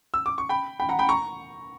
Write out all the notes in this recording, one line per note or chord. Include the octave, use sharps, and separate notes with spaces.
E6
D6
C#6
G5 B5
G5 B5
F#5 A#5
G5 B5
A#5 C#6